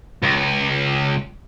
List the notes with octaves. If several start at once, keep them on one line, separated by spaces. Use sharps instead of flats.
C#2